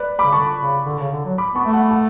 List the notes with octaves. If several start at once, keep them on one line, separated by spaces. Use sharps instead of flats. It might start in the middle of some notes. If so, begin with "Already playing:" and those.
Already playing: B4 D5
B5 D6
C#3
D3 A5 C#6
C#3
D3
C#3
D3
F#3
B5 D6
B3 A5 C#6
A3
F#5 A5
F#5 A5